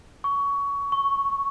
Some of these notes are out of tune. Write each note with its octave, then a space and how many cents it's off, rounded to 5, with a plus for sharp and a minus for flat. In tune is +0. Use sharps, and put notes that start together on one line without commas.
C#6 +20
C#6 +0